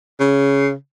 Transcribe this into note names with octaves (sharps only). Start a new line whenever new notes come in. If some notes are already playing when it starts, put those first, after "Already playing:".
C#3